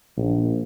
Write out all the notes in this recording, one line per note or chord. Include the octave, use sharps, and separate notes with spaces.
A#1